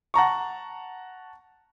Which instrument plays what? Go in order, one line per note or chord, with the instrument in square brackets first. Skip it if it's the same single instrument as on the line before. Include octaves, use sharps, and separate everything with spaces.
[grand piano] F#5 A5 A#5 C#6